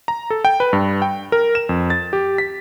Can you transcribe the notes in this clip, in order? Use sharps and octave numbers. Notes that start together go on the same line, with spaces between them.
A#5
A4
G5
B4
G2
G5
A#4
E7
F2
A6
G4
B6